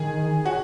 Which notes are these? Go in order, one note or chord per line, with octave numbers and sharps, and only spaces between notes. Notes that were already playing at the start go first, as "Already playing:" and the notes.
Already playing: D#3 G#4
F#4